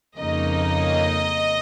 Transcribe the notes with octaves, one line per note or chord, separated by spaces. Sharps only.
F2 C#3 A#3 D#4 D#5